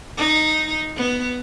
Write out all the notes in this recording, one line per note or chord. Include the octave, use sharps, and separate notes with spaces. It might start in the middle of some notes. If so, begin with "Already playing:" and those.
D#4
B3